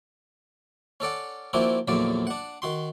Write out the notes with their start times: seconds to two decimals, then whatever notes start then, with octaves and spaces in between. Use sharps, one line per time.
1.00 C#4 A4 D5 F#5
1.53 F3 A#3 C4 D4 E4 F#4
1.88 A#1 E2 A#2 D3 F#3 D5
2.27 D4 F#5
2.62 D#3 F#4 C6